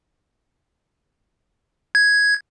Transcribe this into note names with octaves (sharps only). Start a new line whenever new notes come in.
G#6